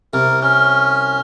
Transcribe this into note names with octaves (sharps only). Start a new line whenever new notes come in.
C2 A#4
C#4 F6